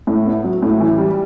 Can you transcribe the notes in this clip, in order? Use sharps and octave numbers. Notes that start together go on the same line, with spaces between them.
A2
B3
F#3
A2
E3
G3